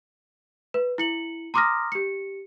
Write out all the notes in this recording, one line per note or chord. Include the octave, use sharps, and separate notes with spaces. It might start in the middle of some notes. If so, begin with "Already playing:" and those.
B4
E4 C#7 F#7
A#5 C6 D6 D#6 F6 A#6
G4 C#7